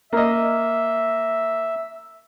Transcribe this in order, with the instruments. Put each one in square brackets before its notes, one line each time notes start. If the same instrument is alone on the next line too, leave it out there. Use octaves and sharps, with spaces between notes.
[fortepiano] A#3 D#5 [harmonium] E5